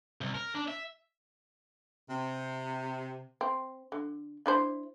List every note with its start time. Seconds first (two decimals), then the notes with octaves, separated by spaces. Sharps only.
0.21 C2
0.35 A#4
0.55 D4
0.68 E5
2.09 C3
3.41 C4
3.92 D3
4.46 D4 E4 C5